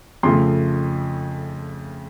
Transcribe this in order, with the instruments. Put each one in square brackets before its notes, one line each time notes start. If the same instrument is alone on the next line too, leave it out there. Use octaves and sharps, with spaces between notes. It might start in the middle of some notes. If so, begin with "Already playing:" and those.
[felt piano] F2 C#3 F3 A3 C6